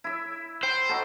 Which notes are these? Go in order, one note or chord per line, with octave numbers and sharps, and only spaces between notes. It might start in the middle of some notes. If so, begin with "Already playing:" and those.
E4 E5
C5 G5
D#4 F#4 A4